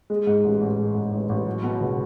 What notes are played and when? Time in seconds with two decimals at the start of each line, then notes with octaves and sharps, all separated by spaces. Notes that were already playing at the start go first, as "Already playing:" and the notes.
0.10 G#3
0.27 G#2
0.44 A1
0.61 A1
0.78 G#3
0.95 G#2
1.12 A1
1.29 A1
1.47 F#3
1.64 B2
1.81 C#2